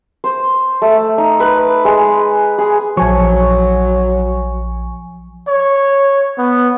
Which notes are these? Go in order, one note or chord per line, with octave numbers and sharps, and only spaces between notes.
C5
A3
D#4
B4
G#3
G#4
A#1 F3 F#3 G#5 C#6
C#5
B3